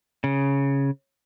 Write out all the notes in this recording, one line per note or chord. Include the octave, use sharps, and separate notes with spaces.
C#3